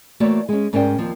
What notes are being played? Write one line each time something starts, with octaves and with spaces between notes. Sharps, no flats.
E3 A3 A#3 F#4 C#5 D5
G#3 C#4
G#2 C#4 A#4 C5 D5 G5
D#2 F3 C4